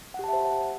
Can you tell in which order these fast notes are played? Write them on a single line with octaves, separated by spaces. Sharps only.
F#5 G4 A5 E5 C5